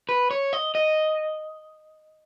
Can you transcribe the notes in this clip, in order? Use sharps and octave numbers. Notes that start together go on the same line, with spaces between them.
B4
C#5
D#5
D#5